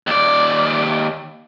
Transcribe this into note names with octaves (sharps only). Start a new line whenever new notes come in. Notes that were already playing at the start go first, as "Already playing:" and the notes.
D#2 D5